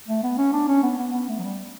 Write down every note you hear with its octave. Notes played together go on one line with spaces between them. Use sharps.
A3
B3
C#4
D4
C#4
B3
B3
B3
A3
F#3
G3